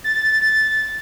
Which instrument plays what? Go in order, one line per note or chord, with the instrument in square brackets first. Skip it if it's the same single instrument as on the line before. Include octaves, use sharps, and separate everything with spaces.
[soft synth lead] A6